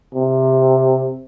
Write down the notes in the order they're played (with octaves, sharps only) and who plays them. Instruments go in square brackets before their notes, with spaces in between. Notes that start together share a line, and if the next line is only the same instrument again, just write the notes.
[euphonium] C3